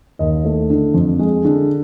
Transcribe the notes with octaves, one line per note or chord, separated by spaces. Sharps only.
D#2 D#5
A3
D3
F2
G#3
D3